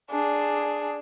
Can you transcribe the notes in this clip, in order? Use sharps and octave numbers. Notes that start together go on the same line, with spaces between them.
D4 G#4